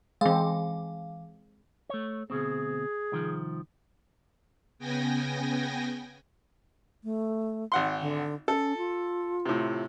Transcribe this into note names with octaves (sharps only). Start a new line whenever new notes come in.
E3 G#3 C4 F5
A3 C#5
D2 B2 C4 G#4
C2 D#3 F3
C#3 B3 G5 G#5 A#6
A3
G#1 F#5 C6
D3
C#4 A4
F4
A2 C3